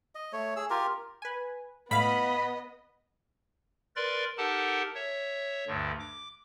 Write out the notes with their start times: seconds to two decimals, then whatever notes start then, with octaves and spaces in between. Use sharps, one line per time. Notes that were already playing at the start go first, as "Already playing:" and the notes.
0.15 D#5
0.33 A3 C#5
0.56 G#4 E6
0.70 F4 G4 A#4
1.22 B4 G#5
1.91 A2 B3 D#5 F5 B5
3.96 A#4 B4 D5 C6 A6
4.38 D#4 G4 A4 A#4 F#5 A5
4.95 C#5 E5
5.67 D2 G2 D3
5.99 D6